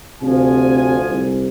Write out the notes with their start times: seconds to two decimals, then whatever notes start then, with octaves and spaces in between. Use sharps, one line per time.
0.22 D2 C3 F3 G#5
1.10 C2